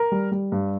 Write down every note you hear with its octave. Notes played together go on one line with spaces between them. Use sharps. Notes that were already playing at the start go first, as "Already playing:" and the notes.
Already playing: A#4
G3
G3
G2